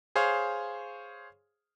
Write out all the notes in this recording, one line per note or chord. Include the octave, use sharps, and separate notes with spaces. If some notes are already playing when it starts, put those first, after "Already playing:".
G#4 C5 C#5 F5